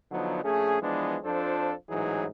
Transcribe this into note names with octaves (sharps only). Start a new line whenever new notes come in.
D3 F3 F#3 B3 D#4
A#1 A3 C#4 G#4
E3 F3 G#3 B3 D4
F2 F3 D4 F4 A4 C5
A1 G#2 E3 F#3 D#4 G#4